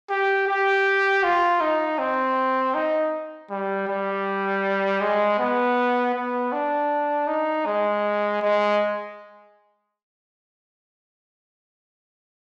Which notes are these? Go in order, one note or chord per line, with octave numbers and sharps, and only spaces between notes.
G4
G4
F4
D#4
C4
D#4
G3
G3
G#3
B3
B3
D4
D#4
G#3
G#3